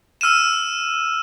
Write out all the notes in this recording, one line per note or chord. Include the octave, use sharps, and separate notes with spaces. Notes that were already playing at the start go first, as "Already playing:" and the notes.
E6 F6 D#7 E7